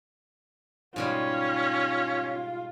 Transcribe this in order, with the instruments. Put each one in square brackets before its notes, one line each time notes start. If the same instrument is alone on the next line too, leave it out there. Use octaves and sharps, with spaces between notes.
[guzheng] G#2 B2 G3 [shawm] C#4 [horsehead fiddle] F4